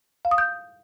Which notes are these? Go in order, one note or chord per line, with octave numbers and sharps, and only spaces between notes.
F5
D#6
G6